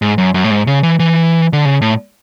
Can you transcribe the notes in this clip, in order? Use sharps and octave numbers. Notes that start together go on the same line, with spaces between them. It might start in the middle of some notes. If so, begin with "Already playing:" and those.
G#2
F#2
F#2
A2
G#2
C#3
E3
E3
D3
C#3
A2